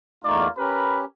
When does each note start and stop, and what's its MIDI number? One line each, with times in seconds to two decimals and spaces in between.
0.24 0.48 40
0.24 0.48 57
0.24 0.49 58
0.24 0.48 63
0.24 0.49 65
0.24 0.49 74
0.58 1.05 61
0.58 1.05 67
0.58 1.04 70
0.58 1.04 71
0.58 1.04 83